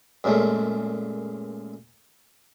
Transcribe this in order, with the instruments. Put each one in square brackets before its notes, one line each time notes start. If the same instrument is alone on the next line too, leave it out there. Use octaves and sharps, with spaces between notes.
[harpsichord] F#2 A#2 C#3 G#3 A3